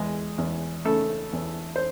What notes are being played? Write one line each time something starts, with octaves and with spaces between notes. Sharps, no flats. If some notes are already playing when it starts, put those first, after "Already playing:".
Already playing: E2 G#3 G#4
E2
C#3 A3 A4
E2
C5